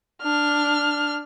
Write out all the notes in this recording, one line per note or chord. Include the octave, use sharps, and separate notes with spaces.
D4 F6